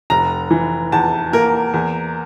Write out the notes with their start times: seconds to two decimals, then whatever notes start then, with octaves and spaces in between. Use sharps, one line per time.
0.10 F1 A#5
0.51 E3
0.92 E2 A5
1.33 A#3 A#4
1.74 E2